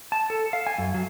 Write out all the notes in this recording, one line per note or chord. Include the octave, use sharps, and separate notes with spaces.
A5
A4
F5
G#5
F#2
F#3